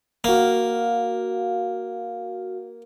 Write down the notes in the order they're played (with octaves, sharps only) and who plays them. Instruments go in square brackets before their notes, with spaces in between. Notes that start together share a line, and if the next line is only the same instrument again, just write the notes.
[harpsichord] A#3 [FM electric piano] F#4 F5